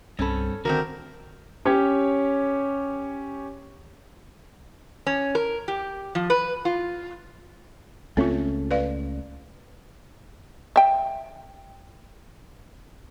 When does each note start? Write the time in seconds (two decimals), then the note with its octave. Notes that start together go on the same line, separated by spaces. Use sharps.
0.19 C2 G2 C4 C#4 A4 B5
0.65 D3 D#3 A3 C4 F#4 A#4
1.65 C#4 G4 C#5
5.07 C#4
5.35 A#4
5.68 G4
6.15 F3
6.30 B4
6.65 F4
8.17 C#2 A3 C4 C#4 F4
8.71 B4 D5 F5
10.76 E5 G5